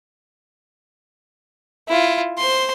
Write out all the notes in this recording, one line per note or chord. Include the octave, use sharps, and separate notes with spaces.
E4 F4
C5 C6